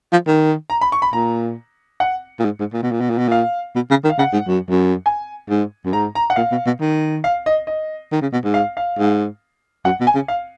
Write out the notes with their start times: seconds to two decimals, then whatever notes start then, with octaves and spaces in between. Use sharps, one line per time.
0.12 F3
0.27 D#3
0.70 A#5
0.81 B5
0.92 C#6
1.02 B5
1.13 A#2 A#5
2.00 F#5
2.39 A#2
2.44 G#2
2.59 G#2
2.73 A#2
2.82 B2
2.91 A#2
3.00 B2
3.10 A#2
3.18 B2
3.28 A#2 F5
3.75 B2
3.90 C#3
4.04 D#3
4.10 F5
4.18 C#3 F#5
4.33 G#2
4.47 F#2
4.69 F#2
5.06 G#5
5.49 G#2
5.85 F#2
5.93 G#2 A#5
6.15 A#5
6.30 F#5
6.36 A#2 F5
6.51 B2
6.66 B2
6.80 D#3
7.24 F5
7.46 D#5
7.67 D#5
8.12 D#3
8.21 C#3
8.33 B2
8.44 G#2
8.54 F5
8.77 F5
8.99 G#2
9.85 F#2 F#5
10.00 B2
10.07 G#5
10.14 C#3
10.28 F5